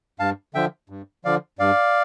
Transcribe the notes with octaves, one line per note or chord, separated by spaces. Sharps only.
G2 F5 A5
D3 F3 E5 G5
G2
D3 F3 D5 F5
G2 D5 F5